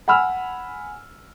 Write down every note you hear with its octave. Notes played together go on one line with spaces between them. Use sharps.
F#5 G#5 B5 E6 F6